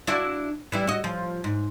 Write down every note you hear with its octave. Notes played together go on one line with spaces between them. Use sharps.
D4 E4 F#4
E3 G3 E4
F#4 D#5
F3
G#2